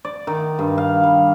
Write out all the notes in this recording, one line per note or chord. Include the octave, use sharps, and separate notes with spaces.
D5
D#3
G2
F5
G3